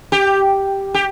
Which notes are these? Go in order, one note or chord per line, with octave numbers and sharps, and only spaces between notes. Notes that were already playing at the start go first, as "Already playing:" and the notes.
G4
G4